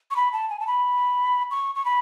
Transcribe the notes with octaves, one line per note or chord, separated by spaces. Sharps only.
C#6
B5
A5
G#5
A5
B5
C#6
C#6
B5